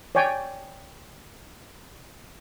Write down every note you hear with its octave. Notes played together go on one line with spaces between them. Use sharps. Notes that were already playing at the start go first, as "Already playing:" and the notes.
C#5 D5 G5 G#5